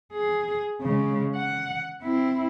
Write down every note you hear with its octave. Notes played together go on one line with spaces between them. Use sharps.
G#4
C#3 G#3
F#5
C4 E4